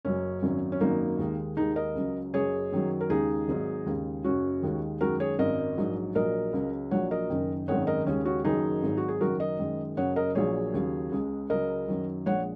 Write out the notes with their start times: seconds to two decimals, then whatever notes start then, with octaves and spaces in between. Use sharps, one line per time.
0.05 F#1 F#2 F#3 C#4
0.42 G#1 F#2 F#3
0.72 C#4
0.81 G#1 F#2 F#3 A#3 D#4
1.19 D#2 D#3 G#3
1.57 D#2 D#3 G#3 D#4 G#4
1.76 A#4 D#5
1.95 C#2 C#3 F#3
2.34 F#1 F#2 F#3 G#4 C#5
2.72 F#2 D#3 F#3
3.01 A#4
3.10 D#2 C#3 G#3 D#4 G#4
3.48 G#1 G#2 F#3
3.86 D#2 C#3 G#3
4.24 F#1 F#2 C#3 F#3 C#4 F#4
4.63 D#2 D#3 G#3
5.01 F#2 D#3 G#3 F#4 A#4
5.20 G#4 C#5
5.39 G#1 F#2 F#3 A#4 D#5
5.77 A#1 G#2 F#3
6.15 A#1 A#2 F#3 A#4 D#5
6.53 C#2 C#3 F#3
6.91 A#1 A#2 F#3 C#5 F#5
7.11 A#4 D#5
7.30 F#1 F#2 D#3
7.68 G#1 F#2 D#3 G#3 C#5 F#5
7.87 A#4 D#5
8.06 D#2 C#3 G#3 C#4
8.25 C#4 F#4
8.44 F#1 F#2 D#3 F#3 D#4 G#4
8.83 G#1 G#2 F#3
8.97 F#4
9.08 G#4
9.21 F#1 F#2 D#3 F#3 F#4 A#4
9.40 A#4 D#5
9.59 F#2 D#3 G#3
9.97 F#1 F#2 C#3 F#3 C#5 F#5
10.16 A#4 D#5
10.35 A#1 A#2 F#3 G#4 C#5
10.74 D#2 C#3 F#3
11.12 C#2 C#3 G#3
11.50 C#2 C#3 F#3 A#4 D#5
11.88 F#2 D#3 F#3
12.26 A#1 A#2 G#3 C#5 F#5